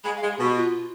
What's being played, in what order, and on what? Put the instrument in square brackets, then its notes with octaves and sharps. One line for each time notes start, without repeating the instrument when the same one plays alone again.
[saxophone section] G#3 [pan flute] B5
[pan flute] F5
[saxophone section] G#3
[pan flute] G#4
[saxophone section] B2 [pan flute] G4
[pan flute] F4